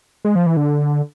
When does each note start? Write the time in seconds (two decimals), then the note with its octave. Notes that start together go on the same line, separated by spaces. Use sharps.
0.25 G#3
0.36 F3
0.46 E3
0.57 D3